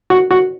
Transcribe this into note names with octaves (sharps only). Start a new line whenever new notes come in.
F#4
F#4